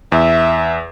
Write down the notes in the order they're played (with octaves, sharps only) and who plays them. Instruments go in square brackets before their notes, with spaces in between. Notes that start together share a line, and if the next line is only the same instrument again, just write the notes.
[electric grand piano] E2 [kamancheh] E5